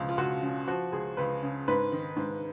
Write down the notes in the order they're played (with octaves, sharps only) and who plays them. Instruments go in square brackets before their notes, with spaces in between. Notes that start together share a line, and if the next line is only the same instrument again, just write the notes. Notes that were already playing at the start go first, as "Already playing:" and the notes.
Already playing: [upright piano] C#2 B2 F3
F4
C#2 F#4
C#3
F3 F#4
C#2 G#4
C#2 B4
C#3
G#2 B4
D#3
G#2